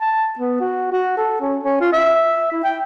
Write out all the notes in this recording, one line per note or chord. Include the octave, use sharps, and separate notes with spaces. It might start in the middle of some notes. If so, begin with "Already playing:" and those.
A5
B3
F#4
F#4
A4
C#4
C#4
F4
E5
E4
G5